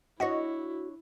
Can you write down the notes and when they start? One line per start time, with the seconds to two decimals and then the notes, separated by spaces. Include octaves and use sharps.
0.20 D4 E4 F#4 C#5 D#5 F#5